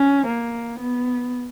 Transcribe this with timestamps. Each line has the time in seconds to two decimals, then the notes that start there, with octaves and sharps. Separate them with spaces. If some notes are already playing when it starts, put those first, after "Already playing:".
Already playing: C#4
0.26 A#3
0.79 B3